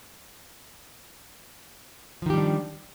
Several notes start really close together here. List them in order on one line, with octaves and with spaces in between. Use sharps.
F3 D#3 G4 G3 D4